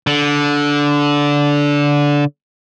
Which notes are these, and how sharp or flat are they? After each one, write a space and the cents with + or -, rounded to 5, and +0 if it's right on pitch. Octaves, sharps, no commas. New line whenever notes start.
D3 -15